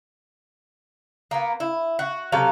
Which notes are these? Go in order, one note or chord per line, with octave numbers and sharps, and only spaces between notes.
A#3 B3
E4
F#4
C3 F#3 A4 F5